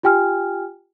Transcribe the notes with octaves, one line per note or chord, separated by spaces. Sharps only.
F4 G4 G5 G#5 F6